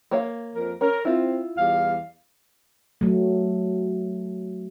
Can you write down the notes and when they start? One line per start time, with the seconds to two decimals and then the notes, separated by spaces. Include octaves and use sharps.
0.11 A#3 C#5 F5
0.55 F2 A#4
0.81 C#4 A#4
1.05 C4 E4 F4
1.58 E2 G3 F5
3.01 F#3 A3